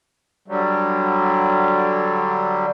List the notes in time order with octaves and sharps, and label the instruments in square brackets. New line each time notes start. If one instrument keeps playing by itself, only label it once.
[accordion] D3 F#3 G3